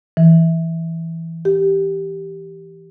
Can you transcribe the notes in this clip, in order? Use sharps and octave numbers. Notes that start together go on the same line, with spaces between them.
E3
G4